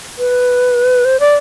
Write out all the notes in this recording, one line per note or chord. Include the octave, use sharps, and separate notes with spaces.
B4
C5
D5